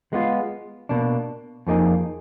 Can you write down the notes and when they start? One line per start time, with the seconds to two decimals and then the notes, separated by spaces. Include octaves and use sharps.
0.13 G#3 B3 F4
0.89 B2 A#3 D4
1.67 F2 F3 A#3 D#4 G#4